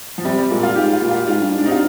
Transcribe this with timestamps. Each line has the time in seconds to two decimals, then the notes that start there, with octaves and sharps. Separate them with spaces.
0.18 F3
0.24 C3 G3
0.38 G3
0.50 A#2 G#3
0.63 F4
0.76 G#2 G4
0.93 F4
1.02 A#2
1.11 F4
1.27 G#2 F4
1.41 G2
1.54 G#2
1.58 D4
1.65 C3 D#4
1.72 F4